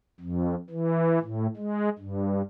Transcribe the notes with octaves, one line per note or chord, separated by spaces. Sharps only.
F2
E3
A2
G#3
G2